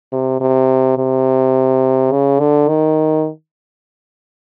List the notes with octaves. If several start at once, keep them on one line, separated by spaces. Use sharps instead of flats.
C3
C3
C3
C#3
D3
D#3